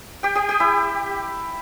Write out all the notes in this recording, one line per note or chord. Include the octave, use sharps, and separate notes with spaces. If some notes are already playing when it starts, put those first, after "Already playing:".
G4 G5
G4 G5
G4 G5
E4 E5